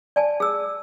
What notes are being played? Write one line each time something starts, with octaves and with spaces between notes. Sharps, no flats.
D5 G#5 A5
G#4 E6